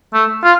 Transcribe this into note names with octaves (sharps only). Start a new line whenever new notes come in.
A3
F4